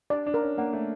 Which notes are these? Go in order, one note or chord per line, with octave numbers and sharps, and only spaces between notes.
D4 D5
D4
A#4
C#4
A#3 F#5
A3